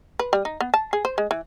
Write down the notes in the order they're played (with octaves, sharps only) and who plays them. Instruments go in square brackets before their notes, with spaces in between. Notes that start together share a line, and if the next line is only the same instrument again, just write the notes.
[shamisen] B4
G3
D#4
B3
A5
G#4
C5
G#3
E3